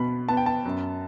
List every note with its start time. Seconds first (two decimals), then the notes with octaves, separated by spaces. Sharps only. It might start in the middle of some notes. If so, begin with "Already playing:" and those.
Already playing: B2 B3 B5
0.29 B3 A5
0.37 G5
0.46 A5
0.65 F#2